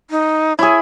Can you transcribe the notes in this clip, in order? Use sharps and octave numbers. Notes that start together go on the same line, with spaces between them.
D#4
E4 G#4 C#5